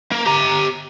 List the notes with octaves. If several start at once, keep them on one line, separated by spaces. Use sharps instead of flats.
A#3
G4 A#5